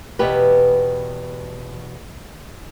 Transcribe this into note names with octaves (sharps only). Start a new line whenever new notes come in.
E2 B2 G4 B4